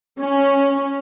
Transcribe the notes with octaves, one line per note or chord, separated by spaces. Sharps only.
C#4